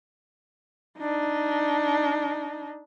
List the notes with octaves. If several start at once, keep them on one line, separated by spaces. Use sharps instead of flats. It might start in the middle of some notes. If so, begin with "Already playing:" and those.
D4 D#4